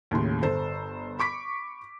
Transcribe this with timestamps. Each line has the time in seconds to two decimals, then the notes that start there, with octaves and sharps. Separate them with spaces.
0.11 D#2 A2 C#3 C6
0.42 G1 A4 C5
1.19 B5 C#6 D6 B6